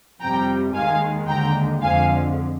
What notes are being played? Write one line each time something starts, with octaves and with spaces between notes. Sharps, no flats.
F2 C3 G3 G5 A#5
D#2 D#3 G#3 F5 G#5
D#2 D3 G#3 G5 A#5
F2 D3 F3 G#3 F5 G#5